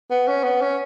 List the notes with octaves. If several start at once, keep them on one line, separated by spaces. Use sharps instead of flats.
B3
C#4
B3
C#4